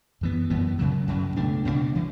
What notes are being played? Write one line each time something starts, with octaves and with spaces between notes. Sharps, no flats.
F#2 E3 B3
F#2 E3 B3
F#2 C#3 F#3
F#2 C#3 F#3
C#2 B2 A3 D4
C#2 B2 A3 D4
E3